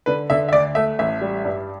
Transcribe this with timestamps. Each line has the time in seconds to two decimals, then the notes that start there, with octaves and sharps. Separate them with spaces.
0.06 D3 B4
0.30 D3 E5
0.49 E5
0.52 D2 D5
0.75 A3 E5
0.99 A1 E5
1.21 G3
1.45 G2